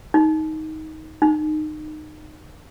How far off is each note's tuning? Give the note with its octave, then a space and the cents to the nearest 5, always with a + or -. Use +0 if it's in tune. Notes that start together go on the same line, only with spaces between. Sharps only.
D#4 +15
D#4 -20